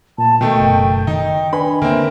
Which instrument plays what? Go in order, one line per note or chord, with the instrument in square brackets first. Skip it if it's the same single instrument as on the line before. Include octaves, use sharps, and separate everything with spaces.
[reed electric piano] A#2 [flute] A5
[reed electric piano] B2 [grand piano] D#3 A3 [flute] G5
[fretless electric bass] F#1
[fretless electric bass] D#3 [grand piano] D#4
[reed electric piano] D4 B4 G#5 [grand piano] B5
[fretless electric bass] D3 [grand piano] A#3 C4 [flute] E5